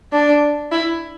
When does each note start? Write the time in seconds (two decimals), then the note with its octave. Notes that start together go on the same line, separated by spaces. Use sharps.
0.12 D4
0.72 E4